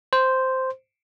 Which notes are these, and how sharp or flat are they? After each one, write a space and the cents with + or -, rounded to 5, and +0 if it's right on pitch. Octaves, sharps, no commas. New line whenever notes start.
C5 -5